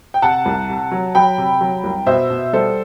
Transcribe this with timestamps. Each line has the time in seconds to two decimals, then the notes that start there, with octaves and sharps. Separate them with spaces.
0.14 G5
0.22 C3 F#5 A5
0.46 C2
0.69 C3
0.92 F#3
1.15 F#3 G5 B5
1.38 C3
1.61 F#3
1.84 C2
2.06 B2 C5 E5
2.30 B2
2.53 G3 A4 C5